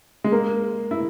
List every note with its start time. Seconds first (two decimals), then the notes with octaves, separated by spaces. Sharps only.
0.24 G#3
0.32 A#3
0.91 E4